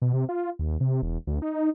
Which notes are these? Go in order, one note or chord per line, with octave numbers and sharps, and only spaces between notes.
B2
C3
F4
D#2
C3
E1
D2
D#4